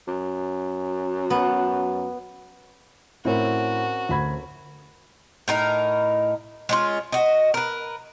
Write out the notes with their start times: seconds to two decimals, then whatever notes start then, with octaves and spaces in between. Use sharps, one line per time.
0.08 F#2
1.30 B3
3.25 A2 C4 C#4 F#4 A#4
4.09 D2 B5 G#6
5.48 A2 D#4 A#4
6.69 G#3 C#4 F4
7.12 F#4 D#5
7.54 A#4 B4